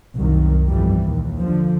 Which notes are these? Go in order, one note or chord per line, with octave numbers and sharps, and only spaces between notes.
C2 F#2 D#3
G1 F2 E3 G3
A#1 D#2
D3 F3